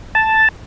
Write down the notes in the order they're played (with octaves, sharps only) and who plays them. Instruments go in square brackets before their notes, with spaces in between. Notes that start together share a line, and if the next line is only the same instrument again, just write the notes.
[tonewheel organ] A5